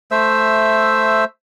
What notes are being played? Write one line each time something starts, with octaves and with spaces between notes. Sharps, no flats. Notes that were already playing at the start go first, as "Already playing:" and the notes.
A3 C5 E5 E6